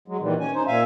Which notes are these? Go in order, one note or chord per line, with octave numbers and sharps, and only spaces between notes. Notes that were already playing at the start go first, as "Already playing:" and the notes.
F#3 G#3
A#2 D#3 E3 G3
C#4 G#5
D#4 C5
A#2 E5 F5 G#5